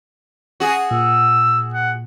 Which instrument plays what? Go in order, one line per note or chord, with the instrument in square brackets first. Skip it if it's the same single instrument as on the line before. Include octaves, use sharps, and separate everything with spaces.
[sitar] F#4 G#4
[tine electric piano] A#2 [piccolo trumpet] E6
[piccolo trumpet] F#5